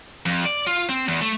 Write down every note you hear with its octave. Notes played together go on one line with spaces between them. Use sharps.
F2
D5
F4
C4
E2
A3